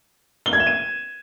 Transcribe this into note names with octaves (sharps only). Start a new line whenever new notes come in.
G7
G#6
E7
D#7